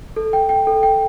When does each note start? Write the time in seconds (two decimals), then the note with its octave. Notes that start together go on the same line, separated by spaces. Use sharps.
0.16 A4
0.33 G5
0.49 G5
0.67 A4
0.83 G5